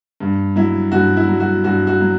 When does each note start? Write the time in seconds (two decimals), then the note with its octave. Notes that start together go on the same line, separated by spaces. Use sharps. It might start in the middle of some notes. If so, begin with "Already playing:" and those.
0.20 G2
0.56 F#3 E4
0.92 G2 F#4
1.17 E4
1.28 F#3
1.40 F#4
1.64 G2 F#4
1.87 F#4
2.00 F#3